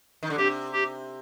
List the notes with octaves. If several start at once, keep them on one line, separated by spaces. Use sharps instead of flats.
D#3
D3
C3 G4
G4